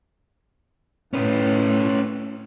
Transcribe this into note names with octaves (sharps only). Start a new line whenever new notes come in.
A2 C#4 B4